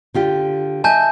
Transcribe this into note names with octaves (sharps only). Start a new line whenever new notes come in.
D3 F4 G4
D#5 E5 G#5 A5 G6